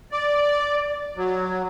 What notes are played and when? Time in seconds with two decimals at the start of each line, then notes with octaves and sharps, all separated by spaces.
0.12 D5
1.17 F#3